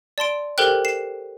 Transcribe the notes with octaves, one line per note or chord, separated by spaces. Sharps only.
D5 A5 C6 D7
G4 A4 A#4 C5 G5 F#6
C7 E7